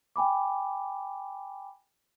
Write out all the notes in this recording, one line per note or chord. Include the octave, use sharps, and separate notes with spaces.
G5 G#5 B5 D6